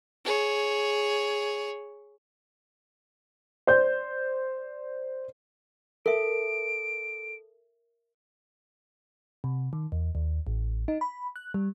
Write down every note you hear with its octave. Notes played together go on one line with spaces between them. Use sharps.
G#4 C#5
C5 D5 G6
A4 A#4 E5 D7
C3
D#3
E2
D#2
A1
D#4
B5
F#6
G3